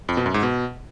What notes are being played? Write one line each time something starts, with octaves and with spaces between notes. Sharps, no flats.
F2
B2
F#2
G#2
B2